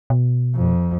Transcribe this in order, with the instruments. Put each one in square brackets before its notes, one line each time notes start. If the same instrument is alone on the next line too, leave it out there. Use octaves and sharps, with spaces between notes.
[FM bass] B2
[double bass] F2